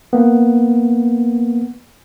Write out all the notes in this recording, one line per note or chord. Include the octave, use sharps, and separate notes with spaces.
A#3 B3